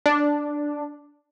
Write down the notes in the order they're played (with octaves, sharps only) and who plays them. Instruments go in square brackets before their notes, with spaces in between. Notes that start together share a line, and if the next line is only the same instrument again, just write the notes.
[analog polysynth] D4